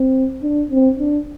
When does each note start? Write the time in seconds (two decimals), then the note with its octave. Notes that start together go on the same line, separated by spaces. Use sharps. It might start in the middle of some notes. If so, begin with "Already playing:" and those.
Already playing: C4
0.43 D4
0.71 C4
0.99 D4